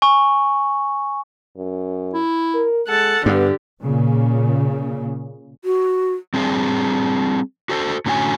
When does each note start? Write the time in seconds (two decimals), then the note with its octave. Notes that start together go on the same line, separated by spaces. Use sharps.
0.02 G#5 C#6
1.56 F#2
2.14 E4
2.54 A#4
2.88 G#3 A4 F#5 A5
3.26 G2 D3 B3 G4
3.82 A#2 C#3
5.64 F#4
6.34 G3 C4 D4 G#4 D5
7.69 F#4 A4 C5
8.06 A2 D3 C#4 F#4 E5 G#5